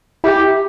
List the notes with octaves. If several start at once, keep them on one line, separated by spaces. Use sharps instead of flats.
E4 G4